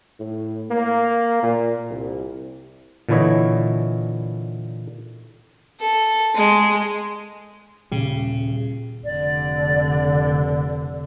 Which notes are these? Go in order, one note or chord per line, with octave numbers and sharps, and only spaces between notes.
A2
A#3
A#2
C2
A#2 D3 E3 E4 C#5 D#5
A4
G#3
D#1 A#2 C#3 G3
F1 D3 D5